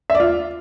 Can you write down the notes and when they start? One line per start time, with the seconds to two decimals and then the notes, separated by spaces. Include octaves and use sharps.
0.10 E5
0.15 D5
0.20 F4